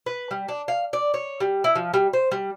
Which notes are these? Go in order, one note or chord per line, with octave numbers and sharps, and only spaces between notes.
B4
G3
D4
F5
D5
C#5
G3
E4
F3
G3
C5
G3